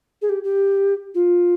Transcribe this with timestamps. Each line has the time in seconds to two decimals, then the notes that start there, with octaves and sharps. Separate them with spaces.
0.22 G#4
0.29 G4
0.44 G4
1.15 F4